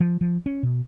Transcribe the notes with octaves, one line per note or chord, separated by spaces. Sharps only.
F3
F3
C#4
B2